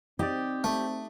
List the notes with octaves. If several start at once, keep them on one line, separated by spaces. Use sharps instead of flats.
C4 D#4 G4 D5
A3